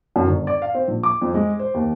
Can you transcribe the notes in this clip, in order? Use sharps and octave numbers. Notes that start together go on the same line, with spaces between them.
F#2
G1
D5
F5
C4
A#1
D6
F2
G#3
C5
D#2